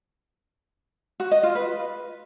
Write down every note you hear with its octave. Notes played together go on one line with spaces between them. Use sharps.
F#4
D#5
F4
B4